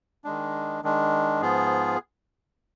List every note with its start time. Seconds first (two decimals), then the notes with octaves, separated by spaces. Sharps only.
0.24 D#3 G#3 D4
0.83 D#3 G#3 D4
1.41 G#2 F3 B3 F4 G#4